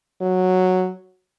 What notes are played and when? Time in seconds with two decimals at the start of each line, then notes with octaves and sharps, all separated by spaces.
0.21 F#3